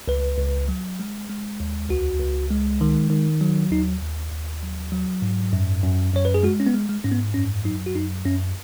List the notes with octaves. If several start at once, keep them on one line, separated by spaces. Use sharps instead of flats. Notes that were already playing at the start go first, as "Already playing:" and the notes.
C#2 B4
C#2
F#3
G#3
G#3
D#2
C#2 F#4
C#2
G#3
D#3
D#3
F#3
D#2 D#4
D#2
D#2
F#3
F#3
G#2
F#2
F#2
F#2 C#5
B4
G#4
G#3 F#4
C#4
B3
G#3
G#3
G#2 C#4
B3
F#2 C#4
F#3 D#4
F#4
F#2 D#4
F#2 C#4